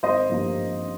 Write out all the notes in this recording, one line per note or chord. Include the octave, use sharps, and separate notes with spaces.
G#1 C5 D#5
G2 F3 A#3